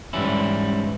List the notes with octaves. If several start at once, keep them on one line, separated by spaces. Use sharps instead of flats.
G#2 E3 G3 C#4 E4